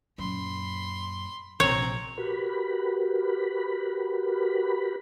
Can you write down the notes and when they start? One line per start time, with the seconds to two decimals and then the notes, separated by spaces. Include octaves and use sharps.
0.18 F#2 A#2 B5 C6
1.60 A#1 C3 C4 C#5 A#5
2.18 F#4 G4 A#4 B4 B5